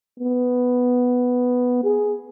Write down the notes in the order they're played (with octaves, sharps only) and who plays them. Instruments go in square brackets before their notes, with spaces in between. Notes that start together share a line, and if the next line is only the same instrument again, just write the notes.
[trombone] B3
G#4